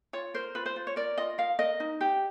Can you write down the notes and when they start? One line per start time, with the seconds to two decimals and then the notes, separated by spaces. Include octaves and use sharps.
0.13 F4 C#5
0.34 A#4 C5
0.55 F4 B4
0.66 C5
0.76 F4
0.87 C#5
0.96 A#4 D5
1.18 F4 D#5
1.38 A#4 F5
1.59 A#4 D#5
1.80 D#4
2.01 G4